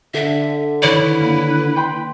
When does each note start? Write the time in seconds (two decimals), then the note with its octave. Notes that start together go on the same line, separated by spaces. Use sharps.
0.14 D3 E5
0.82 D#3 E4 B4 C#5 D5
1.20 A#3
1.76 G5 B5 C6